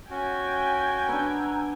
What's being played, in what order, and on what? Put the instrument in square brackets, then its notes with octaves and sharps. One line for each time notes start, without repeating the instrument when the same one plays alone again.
[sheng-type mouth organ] C#4 F#4 [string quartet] G5 G#5 G#6
[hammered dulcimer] B3 D4 [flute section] A#5 E6 F#6